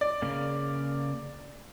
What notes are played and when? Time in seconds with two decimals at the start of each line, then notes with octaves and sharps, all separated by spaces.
0.01 D5
0.22 C#3 A#3